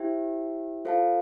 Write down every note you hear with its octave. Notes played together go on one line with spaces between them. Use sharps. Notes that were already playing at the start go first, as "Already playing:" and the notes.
Already playing: E4 G4 C5 E5 G5
F4 A4 C5 F5 A5